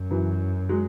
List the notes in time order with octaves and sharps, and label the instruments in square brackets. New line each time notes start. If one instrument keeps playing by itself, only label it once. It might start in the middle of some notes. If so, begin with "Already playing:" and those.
Already playing: [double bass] F#2
[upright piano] E3 F#3
F#3 G#3